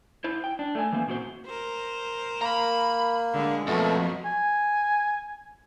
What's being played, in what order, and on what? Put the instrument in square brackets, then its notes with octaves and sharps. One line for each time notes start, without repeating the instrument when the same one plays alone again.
[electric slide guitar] E4 C5
G5
D4
A3 G#5
E3 A#3 C4
A#2 C4 F#4 C5
[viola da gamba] A#4 C5
[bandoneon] A#3 [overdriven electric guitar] A#5 B5
[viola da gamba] D3 G#3
[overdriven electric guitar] F2 [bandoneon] B2 A3 [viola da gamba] F3 F#3 A#3
[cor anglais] G#5